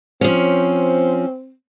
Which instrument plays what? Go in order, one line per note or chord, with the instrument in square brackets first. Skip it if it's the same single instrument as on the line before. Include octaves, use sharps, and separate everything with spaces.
[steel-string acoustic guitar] F3 C#4 [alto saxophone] C4